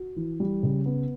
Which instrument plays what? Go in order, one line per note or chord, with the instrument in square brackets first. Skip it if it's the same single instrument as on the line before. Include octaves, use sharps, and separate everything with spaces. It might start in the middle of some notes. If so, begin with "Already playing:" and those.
Already playing: [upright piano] F#4
E3
G3
C#3
B3